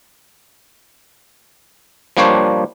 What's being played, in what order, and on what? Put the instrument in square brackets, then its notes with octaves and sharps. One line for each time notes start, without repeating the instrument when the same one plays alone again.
[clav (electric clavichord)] F3 G3 A#3 D4 C5 C#5